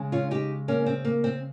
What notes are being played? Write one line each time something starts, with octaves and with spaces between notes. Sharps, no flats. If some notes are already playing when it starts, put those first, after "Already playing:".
Already playing: C#3 G#3
C#4 F4
D#4 G4
A#3 C#4
C4
A#3
C4